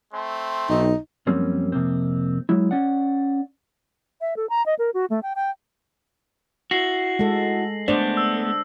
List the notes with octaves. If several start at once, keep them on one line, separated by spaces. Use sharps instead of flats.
A3 C4 C6
B1 D#4
F#2 F3 G3 A#3 C4 C#4
F2 C3 A#3 C4
F#3 G#3 E4
C#4 D5 F#5
E5
A4
A#5
D#5
A#4
F#4
A3
G5
G5
E4 F#4 A#6 C7 F#7
G#3 A4
A3 B3 D4 C5 D5
E6